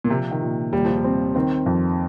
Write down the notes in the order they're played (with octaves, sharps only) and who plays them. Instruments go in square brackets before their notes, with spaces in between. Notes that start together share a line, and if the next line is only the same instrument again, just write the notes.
[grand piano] A#2
[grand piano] C3 [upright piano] F3
[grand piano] D#3
[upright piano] A#2
[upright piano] D#2 [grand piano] G3
[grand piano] F3
G3
[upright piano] C4
[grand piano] D#3 [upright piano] C4
[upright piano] F2